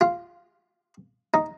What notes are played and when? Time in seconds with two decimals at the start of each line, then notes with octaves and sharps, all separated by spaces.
0.01 F4
1.34 D#4